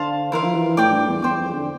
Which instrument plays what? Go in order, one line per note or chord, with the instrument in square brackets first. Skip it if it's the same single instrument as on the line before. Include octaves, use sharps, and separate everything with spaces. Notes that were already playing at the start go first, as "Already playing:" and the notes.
Already playing: [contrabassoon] D3 [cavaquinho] C5 F5 A5
[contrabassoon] E3 [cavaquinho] E4 A#4 F5 C6
[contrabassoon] F3
E3
[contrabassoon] A2 [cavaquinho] D5 G5 D6
[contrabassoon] G2
E2
[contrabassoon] E2 [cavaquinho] C5 G5 D6
[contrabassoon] F2
D3